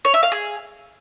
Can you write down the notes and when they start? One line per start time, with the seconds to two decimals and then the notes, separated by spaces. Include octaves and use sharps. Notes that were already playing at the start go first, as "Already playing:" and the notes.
0.05 C#5
0.14 E5
0.23 F5
0.32 G#4